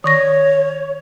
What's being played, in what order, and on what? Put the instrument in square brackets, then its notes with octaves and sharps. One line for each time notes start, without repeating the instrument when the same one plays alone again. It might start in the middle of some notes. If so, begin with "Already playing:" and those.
[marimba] D#3 C#6 A#6 [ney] C#5